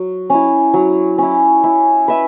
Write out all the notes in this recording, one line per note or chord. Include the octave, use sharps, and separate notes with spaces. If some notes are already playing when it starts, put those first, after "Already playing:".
Already playing: F#3
C#4 E4
F#3
C#4 E4
E4
B4 E5